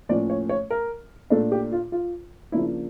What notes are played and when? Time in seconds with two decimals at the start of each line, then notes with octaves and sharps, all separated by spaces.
0.09 A2 F3 A#3 C#4 D5
0.30 C#5
0.49 C#5
0.70 A#4
1.30 A#2 A3 D4 A4
1.52 G4
1.72 F4
1.92 F4
2.52 C#3 F3 A#3 D4 E4